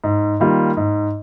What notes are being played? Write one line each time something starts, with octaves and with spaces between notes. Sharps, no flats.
G#2
D#3 G3 A#3 F4
G#2